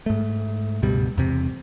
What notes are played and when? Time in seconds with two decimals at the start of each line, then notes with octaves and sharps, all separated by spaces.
0.06 G#2 A3
0.82 C#2 G2 B2 G3
1.18 E2 C3